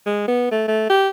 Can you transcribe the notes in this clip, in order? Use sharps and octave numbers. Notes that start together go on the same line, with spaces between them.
G#3
B3
A3
A3
G4